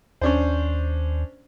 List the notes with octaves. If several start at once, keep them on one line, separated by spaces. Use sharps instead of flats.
D#2 C#4 D4 C5